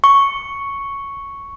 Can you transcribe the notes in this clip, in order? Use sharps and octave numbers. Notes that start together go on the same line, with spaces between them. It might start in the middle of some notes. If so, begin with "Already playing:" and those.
C#6